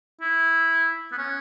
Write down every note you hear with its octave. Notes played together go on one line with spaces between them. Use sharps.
E4
B3
C#4